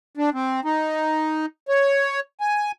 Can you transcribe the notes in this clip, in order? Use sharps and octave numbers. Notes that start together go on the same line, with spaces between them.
D4
C4
D#4
C#5
G#5